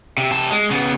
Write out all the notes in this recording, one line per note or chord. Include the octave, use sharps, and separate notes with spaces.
C3
C3 A5
G#3
C#3 B3